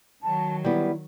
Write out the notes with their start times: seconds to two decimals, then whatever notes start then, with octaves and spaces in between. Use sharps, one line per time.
0.23 D#3 F#3 A5
0.64 G3 B3 E4